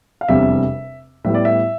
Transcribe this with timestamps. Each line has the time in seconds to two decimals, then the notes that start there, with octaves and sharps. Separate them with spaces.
0.21 F5
0.28 F1 E2 C3 G3 D4 E5
1.24 A2 G3 B3 E4 E5
1.34 D5
1.45 E5